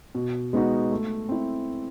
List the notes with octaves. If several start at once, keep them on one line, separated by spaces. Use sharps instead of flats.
B2
G#3 B3 D#4 F#4
A3
C4 E4